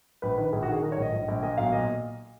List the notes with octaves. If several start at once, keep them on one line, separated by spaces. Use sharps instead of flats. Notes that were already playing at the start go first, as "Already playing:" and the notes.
A#1 B4
D#3 B4
A#1 G#4
F#4
D#3 G#4
D#3 A#4
C#5
A#1
D#5
A#1
A#1
A#2 D#5
B1 F5
A#2 D#5